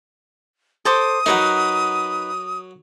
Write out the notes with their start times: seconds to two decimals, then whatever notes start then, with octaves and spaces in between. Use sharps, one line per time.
0.85 A4 C5 D6 D#6
1.26 F#3 D#4 A#4 B4 F#5